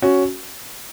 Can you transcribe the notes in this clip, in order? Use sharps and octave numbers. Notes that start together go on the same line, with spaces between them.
C#4 F#4